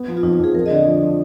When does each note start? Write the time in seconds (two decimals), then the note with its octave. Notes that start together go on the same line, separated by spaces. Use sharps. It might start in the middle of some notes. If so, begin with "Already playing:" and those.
Already playing: B3
0.08 F3
0.17 F4
0.23 F2 D#4
0.33 F4
0.39 F2 G#4
0.54 F3 A#4
0.66 D#5
0.70 D3 D5
0.86 F3
1.02 F3